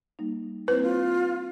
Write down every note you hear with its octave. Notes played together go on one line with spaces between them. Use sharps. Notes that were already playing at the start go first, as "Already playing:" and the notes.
G3 A#3 D#4
A#3 C4 E4 B4 C5
F4